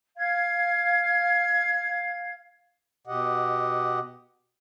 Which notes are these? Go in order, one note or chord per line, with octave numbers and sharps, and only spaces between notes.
F5 G#6
B2 G4 D#5 F#5